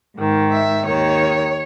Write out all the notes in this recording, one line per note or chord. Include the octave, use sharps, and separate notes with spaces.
G#2 D#3
E5
D#2 D#3 C#5